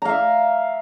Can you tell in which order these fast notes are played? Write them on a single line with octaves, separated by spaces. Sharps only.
A#5 F5 E5